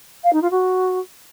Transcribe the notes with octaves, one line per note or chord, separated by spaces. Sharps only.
F5
D#4
F4
F#4